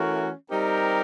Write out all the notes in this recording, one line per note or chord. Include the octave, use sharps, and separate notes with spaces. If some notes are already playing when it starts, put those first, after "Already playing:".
Already playing: E3 A3 C#4 F#4 A#4
G3 C4 D#4 G4 A#4